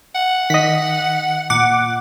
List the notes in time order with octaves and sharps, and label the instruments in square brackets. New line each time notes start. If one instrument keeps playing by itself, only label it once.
[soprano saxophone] F#5
[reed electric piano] D#3 D#5 [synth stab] B6
[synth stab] A#2 F#5 D6